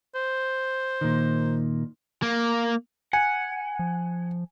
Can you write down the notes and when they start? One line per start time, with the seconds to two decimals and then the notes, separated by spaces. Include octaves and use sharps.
0.15 C5
1.01 A#2 D#3
2.22 A#3
3.13 F#5 G#5
3.79 F3